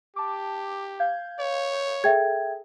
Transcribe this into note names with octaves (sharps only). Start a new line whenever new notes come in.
G4 A5 D6
F5 G6 G#6
C#5
G#4 A4 E5 G5 G#6